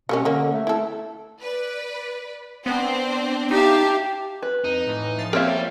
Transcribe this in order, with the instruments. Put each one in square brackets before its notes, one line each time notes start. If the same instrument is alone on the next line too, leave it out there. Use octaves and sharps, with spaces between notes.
[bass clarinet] B2 [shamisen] G3 A#3 C#4
[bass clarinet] D3 [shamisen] A#3 C#4
[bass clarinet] A3
[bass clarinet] A3 [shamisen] E4 A4
[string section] B4 D5
[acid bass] B3 [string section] C4 D4 C5
[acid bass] D#4 [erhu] G4 [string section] E5 F5 A5
[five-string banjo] B4
[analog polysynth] F2 [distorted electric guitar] D#4
[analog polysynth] A2 E3
F3 A6 C7
[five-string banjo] A#3 C4 [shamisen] A#4 C#5 E5 [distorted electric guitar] D5 G5